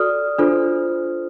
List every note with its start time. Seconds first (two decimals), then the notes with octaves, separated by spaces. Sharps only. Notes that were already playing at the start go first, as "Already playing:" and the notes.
Already playing: F#4 A4 D5 D#6 F6
0.38 D4 F4 A4 C5